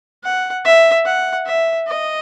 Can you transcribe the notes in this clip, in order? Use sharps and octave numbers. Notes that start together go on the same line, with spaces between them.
F#5
E5
F#5
E5
D#5